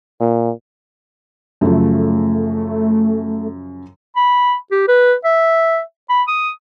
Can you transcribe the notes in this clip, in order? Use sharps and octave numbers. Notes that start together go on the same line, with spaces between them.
A#2
F#2 C#3 F3 A3
B5
G4
B4
E5
B5
D#6